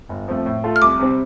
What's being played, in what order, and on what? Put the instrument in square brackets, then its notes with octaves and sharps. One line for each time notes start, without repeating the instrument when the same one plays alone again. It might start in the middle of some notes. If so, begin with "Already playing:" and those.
[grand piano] G1
F2 F3 A3
A2
A3 F4 A4
[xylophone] F6
[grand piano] C2 [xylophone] D6
[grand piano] C3 G3 C4